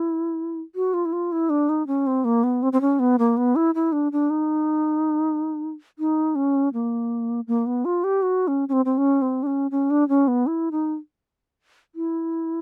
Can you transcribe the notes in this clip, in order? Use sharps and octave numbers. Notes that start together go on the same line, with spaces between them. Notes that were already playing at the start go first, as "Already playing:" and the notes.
Already playing: E4
F#4
F4
E4
F4
E4
D4
D#4
C#4
C4
A#3
B3
C4
C4
C#4
B3
A#3
B3
E4
E4
D4
D4
D#4
D#4
C#4
A#3
A#3
B3
F4
G4
F#4
C#4
C#4
C4
C4
C#4
C4
D4
C#4
C#4
D4
C#4
B3
E4
D#4
E4